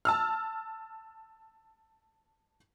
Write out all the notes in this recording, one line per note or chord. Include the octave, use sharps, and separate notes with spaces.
A5 E6 F6